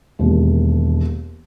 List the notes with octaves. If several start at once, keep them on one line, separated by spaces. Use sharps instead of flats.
E1 D#2